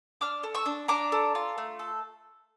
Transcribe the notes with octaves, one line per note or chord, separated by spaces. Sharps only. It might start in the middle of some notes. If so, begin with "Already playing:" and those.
D4 D6 F6
A4
C#6 E6
D4
D4 A#5 D6
A4
F4
A3
A4